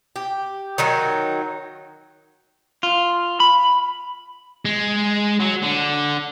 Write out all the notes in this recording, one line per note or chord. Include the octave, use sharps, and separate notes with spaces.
G4
D#3 F#3 D#4
F4
B5
G#3
F#3
D3